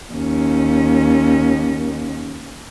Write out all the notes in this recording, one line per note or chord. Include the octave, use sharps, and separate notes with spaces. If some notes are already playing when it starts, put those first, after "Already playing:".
D#2 C#4